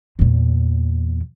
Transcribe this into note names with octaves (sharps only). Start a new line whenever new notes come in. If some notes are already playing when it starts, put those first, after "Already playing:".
E2 A#2